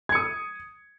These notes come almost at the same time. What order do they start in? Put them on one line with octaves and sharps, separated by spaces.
G#6 C#7 D#6